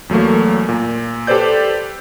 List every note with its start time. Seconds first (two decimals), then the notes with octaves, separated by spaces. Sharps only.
0.09 E2 F#3 A3 A#3
0.69 A#2
1.27 G4 A4 B4 C5 D5 G6